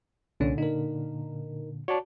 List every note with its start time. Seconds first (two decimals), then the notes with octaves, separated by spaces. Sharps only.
0.40 C2 A#2 D3 C#4 D4
0.58 D#4 A#4
1.88 F#4 C#5 D5 A5